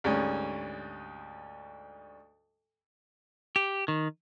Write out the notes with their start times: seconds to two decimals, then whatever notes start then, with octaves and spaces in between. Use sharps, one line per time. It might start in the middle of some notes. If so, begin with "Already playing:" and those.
0.04 D2 G#2 G3 C#4
3.56 G4
3.88 D#3